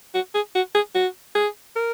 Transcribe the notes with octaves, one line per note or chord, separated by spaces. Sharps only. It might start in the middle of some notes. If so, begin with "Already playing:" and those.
F#4
G#4
F#4
G#4
F#4
G#4
A#4